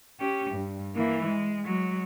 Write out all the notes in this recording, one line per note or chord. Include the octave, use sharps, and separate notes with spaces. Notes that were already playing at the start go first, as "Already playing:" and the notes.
C#4 G4
G2
E3 A#3
G#3
F#3 G#3